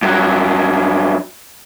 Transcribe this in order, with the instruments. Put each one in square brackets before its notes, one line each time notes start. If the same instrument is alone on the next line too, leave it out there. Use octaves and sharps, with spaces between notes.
[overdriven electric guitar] G2 F#3